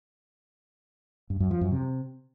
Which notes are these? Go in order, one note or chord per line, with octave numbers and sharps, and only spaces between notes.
G2
F#2
F3
F#2
C3